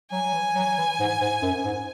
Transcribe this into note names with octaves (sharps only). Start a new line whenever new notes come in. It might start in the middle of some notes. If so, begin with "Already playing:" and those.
F#3 G#5
F#3
E3
F#3
E3
G#2
G#2
F#2
G#2